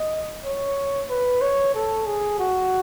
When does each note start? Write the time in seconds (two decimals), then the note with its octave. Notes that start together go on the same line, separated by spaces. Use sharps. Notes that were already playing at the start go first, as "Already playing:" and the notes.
Already playing: D#5
0.44 C#5
1.10 B4
1.41 C#5
1.75 A4
2.06 G#4
2.39 F#4